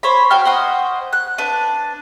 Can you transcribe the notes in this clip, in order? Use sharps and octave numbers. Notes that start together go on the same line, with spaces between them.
C5 C#5 B5
F#4 C#5 G5 F6
C5 D#5 F#5
F#6
D4 B4